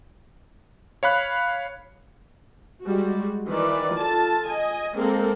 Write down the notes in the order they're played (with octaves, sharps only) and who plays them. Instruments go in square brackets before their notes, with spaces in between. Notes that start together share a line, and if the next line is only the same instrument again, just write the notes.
[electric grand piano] C#5 F5 B5 F#6
[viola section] G3 G#3 F#4
D#3 E3 B4 D5
F4 A4 A5
D#5 G#5
G#3 A#3 C4 A4 A#4